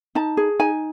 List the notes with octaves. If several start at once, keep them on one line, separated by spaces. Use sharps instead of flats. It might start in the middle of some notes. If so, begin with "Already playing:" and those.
D#4 A5
G#4
D#4 G#5